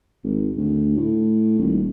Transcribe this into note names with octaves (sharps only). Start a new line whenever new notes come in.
G#1
D2
A2
D#1